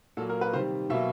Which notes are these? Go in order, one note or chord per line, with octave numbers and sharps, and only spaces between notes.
A#2 F#3 A#3 A4
A#4
B4
C3 D#3 G3 C5
B2 F#3 A#3 E5